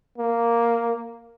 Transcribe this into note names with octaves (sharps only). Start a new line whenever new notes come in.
A#3